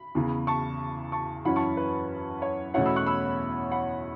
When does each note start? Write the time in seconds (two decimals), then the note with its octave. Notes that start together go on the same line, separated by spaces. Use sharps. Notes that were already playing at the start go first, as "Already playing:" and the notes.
Already playing: B5
0.15 E2 C#3 E3
0.47 A5 C#6
1.12 A5 C#6
1.45 F#2 E3 C#4 E4 F#5 B5
1.56 A5 C#6
1.77 B4
2.42 C#5
2.74 E2 B2 A3 C#4 E4 C#5 F#5
2.86 B5 E6
2.96 C#6 F#6
3.07 B5 E6
3.71 F#5 B5